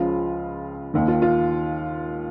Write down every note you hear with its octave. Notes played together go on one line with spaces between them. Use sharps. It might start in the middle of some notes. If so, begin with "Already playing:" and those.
Already playing: C#2 C#3 F3 F4
D#2 D#3
F4
F4